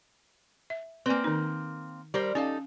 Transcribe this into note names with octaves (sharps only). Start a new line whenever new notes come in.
E5
A#3 C4 B4 D5 G#5
D#3 D#4
G3 A#4 C5
C#4 D#4 A4 F5